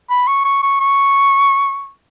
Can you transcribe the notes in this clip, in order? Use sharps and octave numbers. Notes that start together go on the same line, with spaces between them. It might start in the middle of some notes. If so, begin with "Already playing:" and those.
B5
C#6
C#6
C#6
C#6